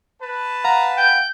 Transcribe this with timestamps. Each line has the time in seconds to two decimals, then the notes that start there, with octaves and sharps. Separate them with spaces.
0.22 B4 A5
0.64 F5 F#5 A#5
0.97 G5 G6